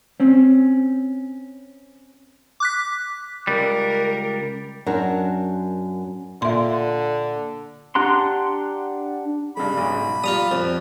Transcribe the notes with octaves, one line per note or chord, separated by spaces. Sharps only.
C4 C#4
D6 F#6 B6
C#2 G3 A#4
F#2 D4 F#4 A#4
A#2 D3 E5 C6
D4 G4 F#5 A#5 C6
G2 C#3 G#3 B5
B1 G#2
G3 F4 A#5 D#6
F2